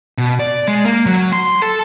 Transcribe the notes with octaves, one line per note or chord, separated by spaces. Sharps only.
B2
D5
G#3
A#3
F#3
C6
A4